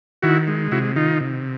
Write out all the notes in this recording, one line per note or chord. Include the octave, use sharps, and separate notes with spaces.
D#3 E4 F#4
G#3
C3 E4 F#4
D#3 D#4 F4
C3